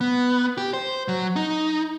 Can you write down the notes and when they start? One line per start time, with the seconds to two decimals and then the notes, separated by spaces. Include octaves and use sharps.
0.01 B3
0.57 G4
0.74 C5
1.08 F#3
1.36 D#4